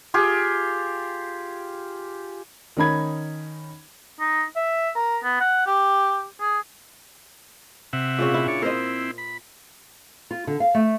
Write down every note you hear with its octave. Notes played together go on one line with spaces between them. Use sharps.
F4 G4 G#4
D#3 C#4 D#4 B5 G#6
D#4
E5
A#4
B3
F#5
G4
G#4
C3 E5 F#5
A#2 C#3 C#4
E4
D4 C#5
C4 E4 A#4 C5 D#5
B5
F4
D3
F5
A3